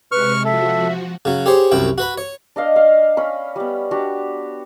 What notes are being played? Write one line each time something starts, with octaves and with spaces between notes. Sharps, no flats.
C3 G#3 B4 C#6 F6
F3 F#4 A4 E5
C#3 F#3
G4 G#4 C5 C#5
C2 F#2 E4 G5
F#4 B4 B5
C#5
D4 D#5 F5
F5
C#4 B5
G3 B3
D4 F#4 G4